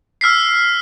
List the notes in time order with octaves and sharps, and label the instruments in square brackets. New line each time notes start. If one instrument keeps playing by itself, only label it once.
[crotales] E6 F6 B6 C7